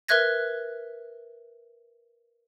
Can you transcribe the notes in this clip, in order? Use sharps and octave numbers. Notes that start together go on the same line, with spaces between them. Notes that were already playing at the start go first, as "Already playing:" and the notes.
A#4 B4 E5 F#6 G#6 A#6